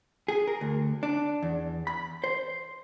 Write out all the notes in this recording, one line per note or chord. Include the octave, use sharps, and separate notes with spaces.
G#4
A#4
D2
D4
E2
B5
C5